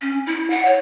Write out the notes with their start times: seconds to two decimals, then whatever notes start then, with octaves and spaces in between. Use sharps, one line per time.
0.02 C#4
0.26 E4
0.50 F#5
0.65 C#5